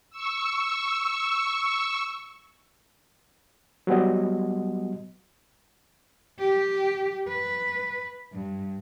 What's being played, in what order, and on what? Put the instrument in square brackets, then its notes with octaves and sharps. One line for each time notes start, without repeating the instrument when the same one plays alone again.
[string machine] C#6 E6
[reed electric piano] F#3 G3 B3 F#4 D#5
[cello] G4
B4
G2